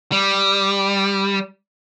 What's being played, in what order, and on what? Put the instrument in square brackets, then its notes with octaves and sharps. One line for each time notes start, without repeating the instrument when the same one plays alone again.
[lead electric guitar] G3